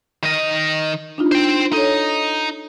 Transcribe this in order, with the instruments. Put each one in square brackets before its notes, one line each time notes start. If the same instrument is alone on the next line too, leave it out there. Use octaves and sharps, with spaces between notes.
[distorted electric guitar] D#3 D#5
[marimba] D4 D#4 F4
[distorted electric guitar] C5 G5
[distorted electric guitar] D#4 [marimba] A4 C#5